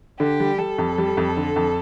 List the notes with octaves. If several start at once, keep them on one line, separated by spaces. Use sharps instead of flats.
D3 G4
G3
G3 A4
F2
G3
F2
D3
F2